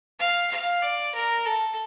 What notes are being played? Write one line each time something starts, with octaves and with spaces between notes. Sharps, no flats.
F5
F5
D5
A#4
A4